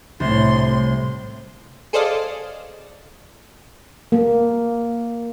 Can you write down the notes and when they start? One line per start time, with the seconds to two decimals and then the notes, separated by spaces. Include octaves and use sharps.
0.20 C2 A2 C6
1.93 G#4 A4 C5 D5 D#5 F5
4.12 A#3